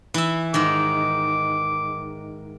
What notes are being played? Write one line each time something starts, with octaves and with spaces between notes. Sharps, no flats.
E3 E5
G#2 D#3 D6